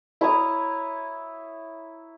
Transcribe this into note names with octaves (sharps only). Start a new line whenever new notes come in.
E4 C#5 A#5 D#6